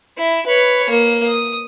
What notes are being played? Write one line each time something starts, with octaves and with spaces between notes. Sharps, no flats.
E4
B4 C#5
A#3
D#6